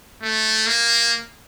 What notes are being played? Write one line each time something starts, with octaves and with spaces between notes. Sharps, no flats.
A3
A#3